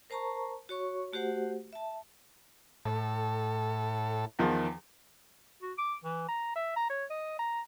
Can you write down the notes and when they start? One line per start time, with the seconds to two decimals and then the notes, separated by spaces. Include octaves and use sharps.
0.10 A#4 C5 A5 A#5 C#6
0.69 F#4 C#5 C#6
1.13 A3 F#4 G4 C5 F#5
1.73 E5 A5
2.85 A2 A4
4.39 E2 D#3 F3
5.62 F#4
5.78 D6
6.04 E3
6.28 A#5
6.55 E5
6.76 A#5
6.90 C#5
7.10 D#5
7.39 A#5